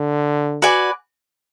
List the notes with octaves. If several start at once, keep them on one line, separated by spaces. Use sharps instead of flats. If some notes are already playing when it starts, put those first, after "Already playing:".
Already playing: D3
F#4 B4 D5 G#5